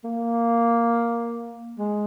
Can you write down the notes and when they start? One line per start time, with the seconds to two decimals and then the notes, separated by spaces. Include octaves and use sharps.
0.04 A#3
1.78 G#3